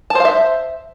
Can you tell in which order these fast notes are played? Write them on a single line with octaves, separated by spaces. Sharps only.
A5 C5 F5 E5